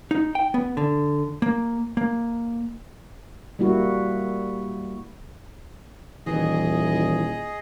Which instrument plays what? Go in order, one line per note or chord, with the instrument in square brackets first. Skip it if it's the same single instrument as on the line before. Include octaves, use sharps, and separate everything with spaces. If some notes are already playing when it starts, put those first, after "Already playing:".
[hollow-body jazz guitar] D#4
G5
B3
D3
A#3
A#3
[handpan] G3 A#3 E4 F#4
[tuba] D#1 [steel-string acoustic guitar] D#3 E3 [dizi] E4 [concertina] G#4 D#5